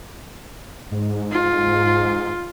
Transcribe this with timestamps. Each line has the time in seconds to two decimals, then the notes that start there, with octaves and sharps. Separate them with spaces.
0.91 G#2
1.32 F4